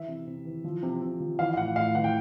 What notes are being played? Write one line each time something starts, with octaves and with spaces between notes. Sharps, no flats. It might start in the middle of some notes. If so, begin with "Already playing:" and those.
Already playing: E3 E5
C3
C3
E3
F3
C3
C3
F3
E3 F5
F5
A2 F#5
A2 F5
E3 F#5
G5